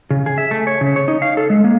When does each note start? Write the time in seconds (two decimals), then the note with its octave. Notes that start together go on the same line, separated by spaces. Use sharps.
0.10 C#3
0.26 G#4
0.38 E5
0.51 A3
0.67 C#5
0.81 C#3
0.96 C#5
1.08 D#4
1.22 F5
1.37 A4
1.50 G#3
1.64 A#3